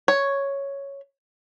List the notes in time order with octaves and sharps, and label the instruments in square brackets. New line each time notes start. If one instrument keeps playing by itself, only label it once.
[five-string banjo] C#5